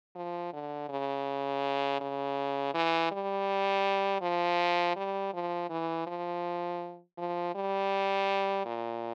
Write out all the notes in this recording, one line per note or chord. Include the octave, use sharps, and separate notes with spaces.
F3
D3
C#3
C#3
E3
G3
F3
G3
F3
E3
F3
F3
G3
A#2